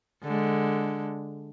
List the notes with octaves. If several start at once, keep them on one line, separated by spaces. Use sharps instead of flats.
D3 G#3